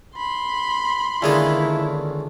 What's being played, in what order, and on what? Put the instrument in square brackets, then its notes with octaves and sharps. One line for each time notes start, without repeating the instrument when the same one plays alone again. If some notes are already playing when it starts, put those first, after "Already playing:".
[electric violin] B5 C6
[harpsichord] C#2 A#3 D4 [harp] D3 D#3 G#4 [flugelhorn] E4